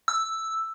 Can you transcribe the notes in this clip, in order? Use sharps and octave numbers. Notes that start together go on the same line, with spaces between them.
E6